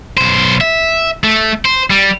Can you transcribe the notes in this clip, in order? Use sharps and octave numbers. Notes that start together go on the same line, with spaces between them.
B1 C5
E5
A3
C5
G3